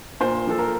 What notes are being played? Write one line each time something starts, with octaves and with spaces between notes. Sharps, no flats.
A#2 C5
F3 A4
A#4